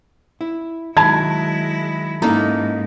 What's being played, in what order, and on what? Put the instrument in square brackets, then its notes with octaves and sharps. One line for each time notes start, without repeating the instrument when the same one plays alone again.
[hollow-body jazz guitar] E4
[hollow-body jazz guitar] D#3 F#3 [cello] G#3 E4 [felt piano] A5 B5 G#6
[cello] G#2 [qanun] A#3 D#4 [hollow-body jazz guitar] C#4 E4 A4